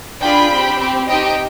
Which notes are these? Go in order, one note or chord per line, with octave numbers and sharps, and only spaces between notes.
D4 F4 G#4 G5 B5
C4 G4
C4 G4
C4 D#4 G4 D#5 G5